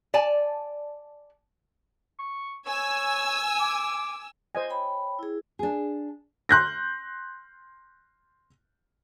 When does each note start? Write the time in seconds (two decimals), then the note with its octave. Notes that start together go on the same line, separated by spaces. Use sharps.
0.14 D5 G#5 A5
2.19 C#6
2.67 C#5 G#5 E6
3.60 D6
4.55 C5 D#5 G#5
4.70 C#5 G5 B5
5.19 E4 G#4
5.59 D4 G#4
6.49 C6 F#6 G6 A#6